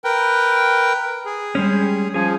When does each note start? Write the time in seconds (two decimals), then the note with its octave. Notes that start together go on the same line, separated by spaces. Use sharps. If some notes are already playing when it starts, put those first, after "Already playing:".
0.04 A#4 B4 G5
1.26 G#4
1.55 G3 G#3 C#4
2.14 F3 C#4 G#4